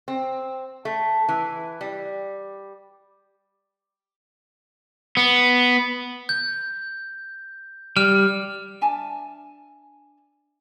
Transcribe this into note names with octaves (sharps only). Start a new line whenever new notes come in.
C4
A3
E3
G3
B3
G6
G3 F6
D4 E5 G#5 A5